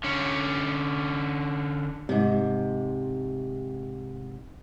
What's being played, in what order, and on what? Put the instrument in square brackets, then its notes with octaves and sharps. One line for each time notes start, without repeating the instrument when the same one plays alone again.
[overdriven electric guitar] D3 C#4
[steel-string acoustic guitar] G#2 C3